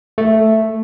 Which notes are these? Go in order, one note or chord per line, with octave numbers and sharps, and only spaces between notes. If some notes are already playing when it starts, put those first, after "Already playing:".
A3